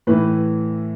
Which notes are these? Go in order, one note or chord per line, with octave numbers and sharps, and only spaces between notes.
A2 E3 B4